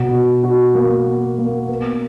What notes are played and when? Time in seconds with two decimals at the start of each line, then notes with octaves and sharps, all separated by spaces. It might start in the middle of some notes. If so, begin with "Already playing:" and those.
Already playing: B2
0.12 F#4
0.44 F#4
0.75 A#3
1.07 A#3
1.38 A#3
1.69 B3